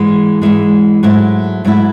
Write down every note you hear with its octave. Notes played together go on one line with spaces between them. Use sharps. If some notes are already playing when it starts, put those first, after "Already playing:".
Already playing: G#2 E3 G#3
G#2 E3 G#3
G#2 F#3 A3 E4
G#2 F#3 A3 E4